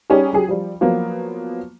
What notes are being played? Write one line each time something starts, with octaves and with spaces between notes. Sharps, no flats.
G3 C#4 D#4 G4 G#4
F#3 G4 G#4
F3 G3
F3 F#3 A#3 B3